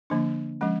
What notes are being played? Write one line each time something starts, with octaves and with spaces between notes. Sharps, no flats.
D3 F3 A#3 D4
F3 G#3 C#4